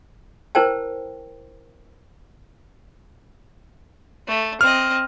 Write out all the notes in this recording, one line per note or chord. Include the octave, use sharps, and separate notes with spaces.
E4 A#4 C5 G5 A5
A3
C4 D#5 F6